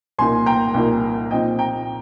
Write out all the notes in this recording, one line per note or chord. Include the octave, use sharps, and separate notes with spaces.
C2 A#2 F3 A#3 D#4 G#5 C6
G5 A#5
C2 A#2 F3 A#3 D#4
A#2 F3 C4 D#4 D#5 G5
G5 A#5